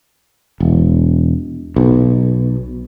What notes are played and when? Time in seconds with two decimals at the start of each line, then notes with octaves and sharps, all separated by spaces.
0.60 E1
1.76 B1